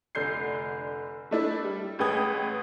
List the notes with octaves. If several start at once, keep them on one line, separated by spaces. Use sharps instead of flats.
F1 D3 G6 C7
A3 D4 E4
G3
A1 G#3 B4 G5 D#6 G#6